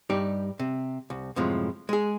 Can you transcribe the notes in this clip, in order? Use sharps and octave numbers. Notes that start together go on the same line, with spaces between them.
G2 G3 D#4 G4 D5
C3
C2
F#2 A2 C3 F3 G#3
G#3 G#4